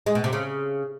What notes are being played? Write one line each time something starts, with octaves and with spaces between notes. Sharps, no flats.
G#3
B2
C3
C#3